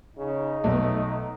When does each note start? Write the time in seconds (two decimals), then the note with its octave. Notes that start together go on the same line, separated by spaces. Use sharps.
0.17 C#3 D#4
0.64 B1 A3